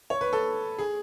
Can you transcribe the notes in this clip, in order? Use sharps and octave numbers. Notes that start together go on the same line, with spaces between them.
C#5
B4
A4
G#4